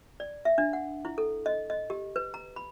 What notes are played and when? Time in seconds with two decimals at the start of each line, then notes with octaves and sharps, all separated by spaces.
0.20 D5
0.45 E5
0.58 D4
0.73 F#5
1.05 E4
1.18 A4
1.46 D#5
1.70 D#5
1.90 G4
2.16 B4
2.34 A#5
2.56 B5